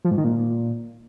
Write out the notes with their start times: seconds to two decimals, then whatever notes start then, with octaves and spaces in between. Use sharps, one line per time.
0.05 F3
0.11 G#2
0.18 D#3
0.24 A#2